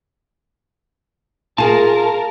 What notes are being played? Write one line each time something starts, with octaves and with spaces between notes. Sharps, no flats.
F4 G#4 A#4 A5